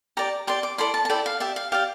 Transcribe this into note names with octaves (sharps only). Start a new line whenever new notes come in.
G4 D5 A#5
G4 D5 C6
D6
E4 A4 D5 C6
A5
A5
E4 A4 D5 G5
F5
G4 D5 E5
F5
G4 D5 F5